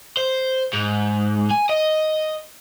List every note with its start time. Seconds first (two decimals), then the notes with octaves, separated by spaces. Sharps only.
0.17 C5
0.73 G#2
1.50 G#5
1.69 D#5